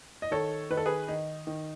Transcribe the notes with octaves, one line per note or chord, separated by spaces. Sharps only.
D#5
D#3 A4 C#5
D#3 B4
A4
G#4 B4
D#3 D#4
D#3